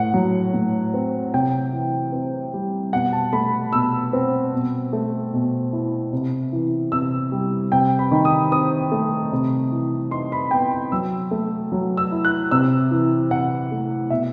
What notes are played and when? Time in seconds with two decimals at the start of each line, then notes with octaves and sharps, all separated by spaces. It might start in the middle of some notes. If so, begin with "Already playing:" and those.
Already playing: A2 F#5
0.14 F#3
0.54 A2
0.94 C4
1.34 C3 G5
1.73 E3
2.13 C4
2.54 G3
2.93 B2 F#5
3.13 A5
3.33 A3 B5
3.73 B2 E6
4.13 C4
4.53 B2
4.93 A3
5.33 B2
5.73 E4
6.13 C3
6.52 E3
6.92 C3 E6
7.32 G3
7.72 C3 G5
7.99 B5
8.11 D#3
8.25 D#6
8.52 C4 D#6
8.92 A3
9.32 C3
9.72 E3
10.11 D#4 C6
10.32 B5
10.51 B3 G5
10.71 B5
10.92 F#3 E6
11.31 A3
11.72 F#3
11.97 E6
12.12 E4
12.25 F#6
12.51 C3 E6
12.91 E3
13.31 C3 F#5
13.71 A3
14.10 B2 E5